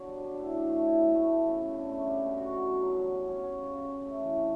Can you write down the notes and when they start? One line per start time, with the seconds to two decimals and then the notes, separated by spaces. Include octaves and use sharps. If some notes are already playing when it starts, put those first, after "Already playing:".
Already playing: D3 F#3 B3
0.08 G3
0.24 D4
0.39 A2
0.55 D4
0.69 A3
0.85 E4
1.00 B3
1.15 A3
1.31 A3
1.46 C#3
1.62 C#3
1.76 D3
1.91 A3
2.07 G3
2.22 B2
2.38 F#4
2.52 F#4
2.68 F#3
2.82 F#3
2.98 G3
3.14 G3
3.29 C#4
3.44 C#4
3.59 C#3
3.74 C#3
3.90 C#3
4.05 A3
4.20 E3
4.35 D4